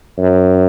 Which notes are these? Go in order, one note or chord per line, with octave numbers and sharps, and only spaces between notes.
F#2